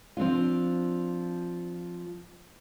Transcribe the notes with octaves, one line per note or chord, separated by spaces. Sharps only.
F3 C4 D4 F4